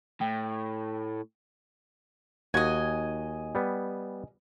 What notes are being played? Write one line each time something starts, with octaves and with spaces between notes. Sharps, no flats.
A2 G5
D#2 F#4 D#5 G#5
G3 B3